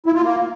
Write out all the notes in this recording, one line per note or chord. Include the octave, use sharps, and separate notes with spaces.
E4
F4
A#3